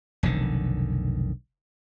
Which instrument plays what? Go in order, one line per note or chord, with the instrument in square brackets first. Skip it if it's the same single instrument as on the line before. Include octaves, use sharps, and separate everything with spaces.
[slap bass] F1 B1 D3 D#3